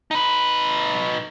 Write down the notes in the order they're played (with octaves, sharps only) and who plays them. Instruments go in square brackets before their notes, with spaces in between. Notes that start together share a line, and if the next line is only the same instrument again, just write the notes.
[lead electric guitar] D#4 B4